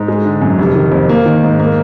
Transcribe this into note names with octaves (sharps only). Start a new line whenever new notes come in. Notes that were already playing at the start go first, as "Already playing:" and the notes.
Already playing: G#2
G#3
D3
F#2
F1
D#3
F2
A#3
D#3
G#2
A#3